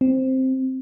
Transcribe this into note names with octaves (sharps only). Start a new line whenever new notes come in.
C4